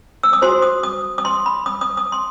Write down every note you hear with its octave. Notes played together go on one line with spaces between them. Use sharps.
E6
D#6
F#4 C5 C6
D#6
D#6
D#6
C6
B5
D#6
D#6
D#6
C6